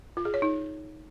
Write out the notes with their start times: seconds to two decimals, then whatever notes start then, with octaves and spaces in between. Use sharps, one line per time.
0.17 F4
0.25 G#4
0.34 C#5
0.42 D#4